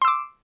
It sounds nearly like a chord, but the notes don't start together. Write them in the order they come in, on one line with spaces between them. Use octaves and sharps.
C6 E6 D6